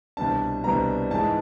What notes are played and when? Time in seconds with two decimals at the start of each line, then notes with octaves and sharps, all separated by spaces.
0.17 C2 B2 G3 B3 D4 A5
0.63 C2 B2 G3 B3 D4 A#5
1.10 G#2 E3 G#3 A5